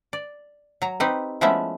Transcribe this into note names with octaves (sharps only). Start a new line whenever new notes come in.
D5
F#3 A#5
C4 D#4 G4 B4
F3 G#3 A3 B3 C#4 E4